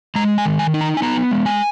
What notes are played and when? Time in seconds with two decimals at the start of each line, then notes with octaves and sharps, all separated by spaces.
0.16 G#3 A#5
0.38 G#5
0.45 D#3
0.59 G#5
0.74 D#4
0.81 A#5
0.97 G#5
1.02 B3 A#5
1.31 G#3
1.46 G#5